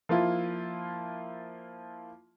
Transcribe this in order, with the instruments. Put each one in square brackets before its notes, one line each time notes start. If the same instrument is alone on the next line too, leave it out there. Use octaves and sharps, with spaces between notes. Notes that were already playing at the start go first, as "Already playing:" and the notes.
[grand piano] F3 A#3 E4 F4